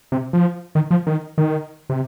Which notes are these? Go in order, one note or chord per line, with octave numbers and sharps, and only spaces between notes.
C3
F3
D#3
F3
D#3
D#3
C3